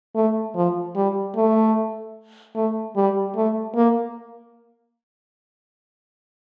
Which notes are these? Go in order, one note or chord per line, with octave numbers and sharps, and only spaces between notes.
A3
F3
G3
A3
A3
G3
A3
A#3